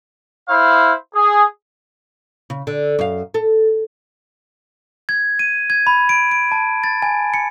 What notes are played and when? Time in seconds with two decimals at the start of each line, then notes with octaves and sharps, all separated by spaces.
0.48 E4 C5 F5
1.14 G#4
2.50 C#3
2.67 D3
2.99 F#2 F5
3.34 A4
5.09 G#6
5.39 D#7
5.70 G#6
5.87 B5
6.09 D7
6.31 D7
6.52 A5
6.84 A6
7.02 G#5
7.34 C#7